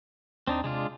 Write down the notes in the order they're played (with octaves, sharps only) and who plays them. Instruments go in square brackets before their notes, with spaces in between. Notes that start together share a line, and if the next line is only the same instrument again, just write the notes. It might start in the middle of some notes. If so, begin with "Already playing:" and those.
[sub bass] D#2 [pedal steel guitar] C4 D4 D#4
[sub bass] C3 [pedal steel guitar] G#3 D4 F4